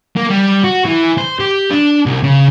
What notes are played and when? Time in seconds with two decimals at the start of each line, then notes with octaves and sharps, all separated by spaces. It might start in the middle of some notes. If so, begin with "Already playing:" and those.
0.16 A#3
0.29 G3
0.64 F#4
0.86 E3
1.18 C5
1.40 G4
1.70 D4
2.06 C2
2.23 C#3